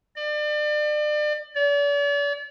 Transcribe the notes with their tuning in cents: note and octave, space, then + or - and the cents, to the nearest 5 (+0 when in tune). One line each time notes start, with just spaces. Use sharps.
D5 +35
D5 -40